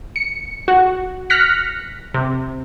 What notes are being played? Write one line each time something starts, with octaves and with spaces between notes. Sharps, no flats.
C#7
F#4
F6 F#6 A#6 B6 C#7
C3